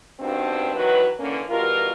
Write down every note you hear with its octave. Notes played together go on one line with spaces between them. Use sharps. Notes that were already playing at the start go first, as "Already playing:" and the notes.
G2 B2 D#3 C4 D4
D#3 E3 F#3 F#4 B4
D3 E3 A#3 C#4
B2 E3 G3 F4 A#4